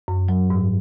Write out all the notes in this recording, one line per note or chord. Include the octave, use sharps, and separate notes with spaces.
F#2
F#3
G#2